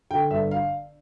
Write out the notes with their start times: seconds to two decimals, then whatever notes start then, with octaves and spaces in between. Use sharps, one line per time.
0.11 D3 G5
0.31 G1 E5
0.51 F5